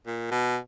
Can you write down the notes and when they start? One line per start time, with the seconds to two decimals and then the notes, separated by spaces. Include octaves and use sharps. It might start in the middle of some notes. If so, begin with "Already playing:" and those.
0.07 A#2
0.31 B2